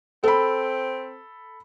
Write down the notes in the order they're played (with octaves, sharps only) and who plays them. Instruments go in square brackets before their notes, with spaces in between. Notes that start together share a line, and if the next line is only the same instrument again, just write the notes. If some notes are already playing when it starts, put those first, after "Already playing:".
[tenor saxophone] C4 [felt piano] A4 B5